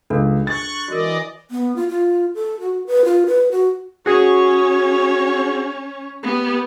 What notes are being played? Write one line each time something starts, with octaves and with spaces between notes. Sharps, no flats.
C#2 D4 A4
C#6 F#6 A6
E3 F#4 A#4 D5 D#5
B3
F4
F4
A4
F#4
B4
F4
B4
F#4
C#4 F#4 G#4 C#5
B3 G4